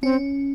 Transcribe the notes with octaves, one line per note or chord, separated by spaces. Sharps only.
C4 C#4